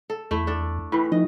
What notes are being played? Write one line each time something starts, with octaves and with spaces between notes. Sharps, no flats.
A4
E2 A3 E4
D4 A4
A2 E3 B5
F3 D#4 D#5